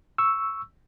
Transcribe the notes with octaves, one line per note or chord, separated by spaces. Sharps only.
C#6 E6